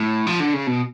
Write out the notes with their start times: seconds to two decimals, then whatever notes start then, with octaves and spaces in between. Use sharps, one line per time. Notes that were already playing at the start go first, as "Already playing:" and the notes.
Already playing: A2
0.27 F3
0.40 D3
0.54 C#3
0.67 B2